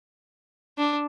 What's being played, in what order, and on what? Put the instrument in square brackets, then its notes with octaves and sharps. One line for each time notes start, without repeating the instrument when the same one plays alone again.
[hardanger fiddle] D4